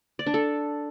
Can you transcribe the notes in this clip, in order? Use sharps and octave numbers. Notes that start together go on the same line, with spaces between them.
D5
D4
A4